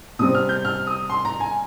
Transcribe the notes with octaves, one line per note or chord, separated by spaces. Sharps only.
C3 G3 C4 D#6
F6
G6
F6
D#6
C6
A#5
G#5